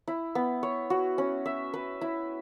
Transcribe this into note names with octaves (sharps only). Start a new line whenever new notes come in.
E4
B3
C#5
F#4
C#4
E5
B4
E4